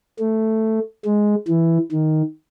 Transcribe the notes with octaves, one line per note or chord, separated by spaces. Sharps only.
A3
G#3
E3
D#3